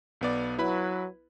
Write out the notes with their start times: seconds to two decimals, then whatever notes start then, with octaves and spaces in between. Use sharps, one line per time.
0.21 B1 B3 D5
0.59 F#3 E4 B4 B5